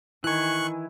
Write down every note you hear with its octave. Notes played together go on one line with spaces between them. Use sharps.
D#3 E3 E4 G#5 C#6 F#6